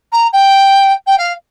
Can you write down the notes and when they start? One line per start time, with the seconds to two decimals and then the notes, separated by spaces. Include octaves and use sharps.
0.12 A#5
0.32 G5
1.06 G5
1.17 F5